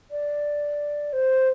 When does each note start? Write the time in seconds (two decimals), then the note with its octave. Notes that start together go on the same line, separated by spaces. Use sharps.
0.11 D5
1.13 C5